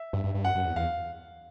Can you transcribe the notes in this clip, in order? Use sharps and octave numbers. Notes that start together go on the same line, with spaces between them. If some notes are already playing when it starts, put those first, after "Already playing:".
Already playing: E5
G2
G2
G2
F#2 F#5
F#2
E2
E2 F5